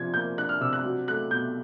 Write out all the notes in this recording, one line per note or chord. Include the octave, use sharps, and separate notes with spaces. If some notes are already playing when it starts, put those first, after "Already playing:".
Already playing: C3 F3 D4 G#6
A#3 G6
D4 F#6
F6
C3 E6
F#6
F#3
A3 F#6
B2 G6